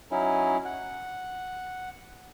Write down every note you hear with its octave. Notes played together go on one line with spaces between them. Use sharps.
F#3 C#4 D#4 E4
F#5